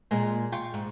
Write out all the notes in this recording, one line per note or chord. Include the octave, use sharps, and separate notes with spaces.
A#2 G#3
F4 G5 C#6
G#2